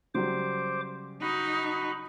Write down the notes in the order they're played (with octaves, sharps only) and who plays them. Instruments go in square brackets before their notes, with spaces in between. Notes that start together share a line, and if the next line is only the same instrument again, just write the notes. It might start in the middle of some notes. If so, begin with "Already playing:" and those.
[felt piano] C#3 F#3 G3 [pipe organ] C5 D6
[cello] D#4 [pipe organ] F#4 B5